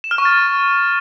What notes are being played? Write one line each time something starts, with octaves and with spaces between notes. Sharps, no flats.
E7
F6
C#6
A6